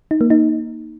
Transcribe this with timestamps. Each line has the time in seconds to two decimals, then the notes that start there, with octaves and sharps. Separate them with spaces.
0.11 D#4
0.21 A#3
0.30 D#4